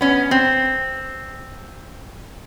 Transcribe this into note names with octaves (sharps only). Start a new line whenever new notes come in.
B3 C#4
C4